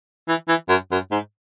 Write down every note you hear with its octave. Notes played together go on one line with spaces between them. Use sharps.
E3
E3
F#2
F#2
G#2